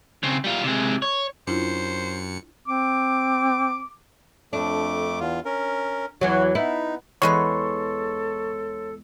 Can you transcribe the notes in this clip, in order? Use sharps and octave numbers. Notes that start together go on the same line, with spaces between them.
C#3 C4
G3 F4
C3 G#3
C#5
F#2 D4 E4 F4 C5 C#7
C4 D6
F2 A3 D4 D6
E2 F4
C#4 A#4
E2 E3 F#3 F#4
B3 D#4 E4
E2 G#3 A4 B4 C#5 C6 C#6